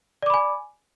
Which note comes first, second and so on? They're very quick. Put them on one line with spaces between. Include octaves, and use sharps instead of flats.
D5 D6 B5 G#5